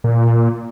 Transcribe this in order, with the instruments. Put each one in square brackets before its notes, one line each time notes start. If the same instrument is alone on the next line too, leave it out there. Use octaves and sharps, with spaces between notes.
[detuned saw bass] A#2